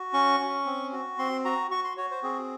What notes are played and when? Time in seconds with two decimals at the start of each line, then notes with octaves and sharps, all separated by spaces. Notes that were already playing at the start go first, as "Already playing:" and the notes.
Already playing: F#4
0.13 C#4 C#6
0.40 C#4
0.66 C4
0.92 F#4
1.18 C4 C6
1.45 F#4 A#5
1.71 F#4 C#6
1.84 C6
1.97 F#4 C#5
2.11 C5
2.23 C4 G#4